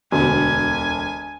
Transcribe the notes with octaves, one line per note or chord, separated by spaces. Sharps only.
E1 D2 G#5